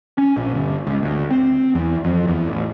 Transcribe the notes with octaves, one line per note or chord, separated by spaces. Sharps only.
C#4
A#1
G1
C#2
D2
C4
E2
F2
E2
A1